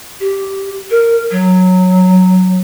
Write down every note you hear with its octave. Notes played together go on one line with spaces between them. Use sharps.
G4
A#4
F#3